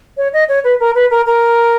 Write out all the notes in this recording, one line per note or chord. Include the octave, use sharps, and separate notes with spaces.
C#5
D#5
C#5
B4
A#4
B4
A#4
A#4